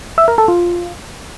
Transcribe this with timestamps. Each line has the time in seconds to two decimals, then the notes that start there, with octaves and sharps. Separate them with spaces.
0.18 E5
0.28 A#4
0.38 A4
0.48 F4